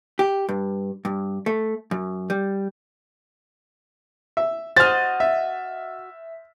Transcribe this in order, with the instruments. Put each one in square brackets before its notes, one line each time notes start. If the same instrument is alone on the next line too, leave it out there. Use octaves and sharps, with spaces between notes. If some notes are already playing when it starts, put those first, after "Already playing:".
[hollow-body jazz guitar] G4
G2
G2
A3
F#2
G3
[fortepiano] E5
[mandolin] F#4 D#5 [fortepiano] C5 [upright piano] F6 A6
[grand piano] E5